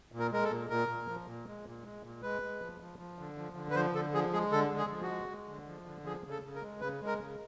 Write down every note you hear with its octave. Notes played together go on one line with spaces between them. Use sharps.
A#2
A#4
G#3 A#4
A4
A#2
A#2 A#4
A#2
F3
A#2
G#3
A#2
G#3
A#2
G#3 B4
G#3
F3
F3
F3
D3
F3
D3
B4
F3 C5
D3 A4
F3 G#4
G#3 G#4
D3 A4
G#3
G#4
F3
F#4
G#3
G#3
D3
F3
D3
F3 G#4
C#3
A4
C#3
A#4
G#3
C#3 B4
G#3
A#4
C#3